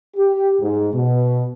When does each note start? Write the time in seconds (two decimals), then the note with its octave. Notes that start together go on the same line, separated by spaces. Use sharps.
0.15 G4
0.61 G#2
0.93 B2